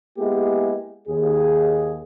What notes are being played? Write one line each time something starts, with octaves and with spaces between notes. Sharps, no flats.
G#3 A#3 B3 E4 G4 G#4
D#2 G#4